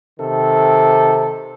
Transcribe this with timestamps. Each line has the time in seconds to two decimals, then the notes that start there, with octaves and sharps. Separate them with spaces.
0.19 C3 D#3 A4